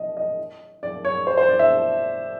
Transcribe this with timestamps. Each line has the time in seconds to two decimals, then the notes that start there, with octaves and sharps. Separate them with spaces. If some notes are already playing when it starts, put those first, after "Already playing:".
Already playing: D#5
0.17 D#5
0.83 D5
1.05 C#5
1.27 C5
1.38 C5
1.49 D5
1.59 E5